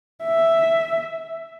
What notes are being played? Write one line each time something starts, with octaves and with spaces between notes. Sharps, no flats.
E5